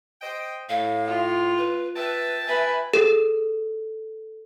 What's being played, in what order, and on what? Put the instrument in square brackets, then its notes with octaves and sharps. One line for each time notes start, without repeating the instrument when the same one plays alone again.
[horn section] C5 D#5 G5
[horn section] A2 [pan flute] F5
[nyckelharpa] F4
[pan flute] B4
[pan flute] B4 [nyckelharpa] E5 [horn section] G5 A5
[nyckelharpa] B4 G#5 [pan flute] E5
[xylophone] G#4 [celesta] A4